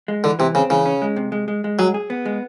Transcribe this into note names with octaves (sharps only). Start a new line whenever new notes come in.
G#3
D3 E3
C3 E3
C#3 C4
C#3 E3
C#4
G#3
C3
G#3
G#3
G#3
F#3 G#4
G#4
B3
G#3